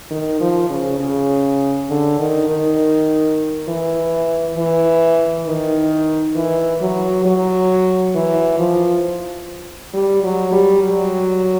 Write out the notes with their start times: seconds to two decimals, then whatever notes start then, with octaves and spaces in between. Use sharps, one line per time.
0.11 D#3
0.41 F3
0.70 C#3
1.00 C#3
1.90 D3
2.19 D#3
2.49 D#3
3.68 E3
4.57 E3
5.47 D#3
6.36 E3
6.81 F#3
7.25 F#3
8.15 E3
8.59 F3
9.94 G3
10.24 F#3
10.52 G3
10.83 F#3